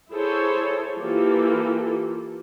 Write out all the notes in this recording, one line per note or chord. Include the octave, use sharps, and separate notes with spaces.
E4 G#4 A4 C5 C#5
E3 A#3 F4 G4 A4